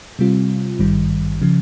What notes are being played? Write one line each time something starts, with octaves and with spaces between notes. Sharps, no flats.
C3 G3 C4 F4
G#1 G2 D#3 G3
C#3 F3